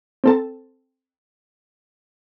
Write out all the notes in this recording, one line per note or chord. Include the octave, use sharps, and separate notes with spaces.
C4 A4 A5